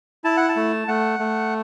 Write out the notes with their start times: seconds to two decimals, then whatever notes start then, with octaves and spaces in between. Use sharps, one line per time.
0.24 E4 A5
0.37 F#5
0.49 A5
0.56 A3
0.88 A3 F#5
1.19 A3